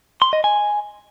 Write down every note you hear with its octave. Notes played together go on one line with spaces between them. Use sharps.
C6
D#5
G#5